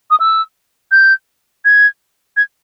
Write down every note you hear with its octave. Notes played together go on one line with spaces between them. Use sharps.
D#6
E6
G6
G#6
G#6